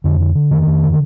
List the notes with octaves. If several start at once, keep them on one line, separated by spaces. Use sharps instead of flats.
F2 D3
D3
D3
F2 D#3
F2
D3